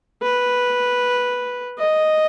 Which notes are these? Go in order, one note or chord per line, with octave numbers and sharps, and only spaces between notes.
B4
D#5